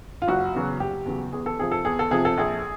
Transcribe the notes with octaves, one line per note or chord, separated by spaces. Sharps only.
F4
F#1 F#4
E2 C#3 F#3
F#1 G4
E2 C#3 F#3
E2 G#4
A4
C3 F3 G#4
A4
E2 G#4
A4
C3 F3 G#4
A4
A#1 G#4